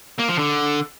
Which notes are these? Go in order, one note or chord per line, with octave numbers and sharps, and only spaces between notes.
A#3
F3
D3